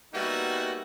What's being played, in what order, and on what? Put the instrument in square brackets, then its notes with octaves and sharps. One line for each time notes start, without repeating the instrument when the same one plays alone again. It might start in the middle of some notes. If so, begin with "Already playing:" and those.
[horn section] G3 A#3 B3 D#4 F#4 E5